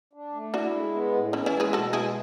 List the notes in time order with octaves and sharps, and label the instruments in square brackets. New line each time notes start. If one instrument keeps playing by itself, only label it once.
[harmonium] D4
A3
[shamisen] D4 F#4 [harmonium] E4
[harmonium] G#3
B3
A2
[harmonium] E3 [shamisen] C#4 E4
[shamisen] C#4 E4
[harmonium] G#3
[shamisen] G#4 B4
[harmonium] B2 [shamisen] F#4 A4
[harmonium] G#3 [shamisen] E4 G#4